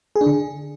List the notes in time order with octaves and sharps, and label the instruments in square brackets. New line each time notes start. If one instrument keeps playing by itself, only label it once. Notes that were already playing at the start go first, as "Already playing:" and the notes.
[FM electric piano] G#4
D4
D3